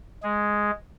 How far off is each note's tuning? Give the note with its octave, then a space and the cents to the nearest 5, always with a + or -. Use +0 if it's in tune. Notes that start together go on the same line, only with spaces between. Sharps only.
G#3 +0 G#4 +0